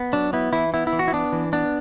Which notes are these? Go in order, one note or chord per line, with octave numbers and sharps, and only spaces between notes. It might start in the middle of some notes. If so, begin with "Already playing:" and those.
Already playing: B3
F#3 D4
B3 E4
E3 E4
B3 E4
E4
E3
F#4
E4
B3 D4
E3
B3 D4